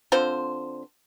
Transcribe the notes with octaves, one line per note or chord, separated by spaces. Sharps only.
D3 C4 F4 C5